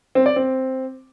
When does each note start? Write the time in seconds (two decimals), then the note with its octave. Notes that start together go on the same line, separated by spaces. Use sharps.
0.15 C4
0.26 D5
0.36 C4